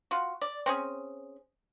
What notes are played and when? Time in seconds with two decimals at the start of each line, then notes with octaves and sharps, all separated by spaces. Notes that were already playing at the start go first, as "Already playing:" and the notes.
0.11 F4 F#4
0.42 D5
0.66 C4 C#4 G#4